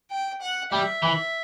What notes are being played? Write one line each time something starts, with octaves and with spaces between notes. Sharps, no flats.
G5
F#5
G3 E5
E3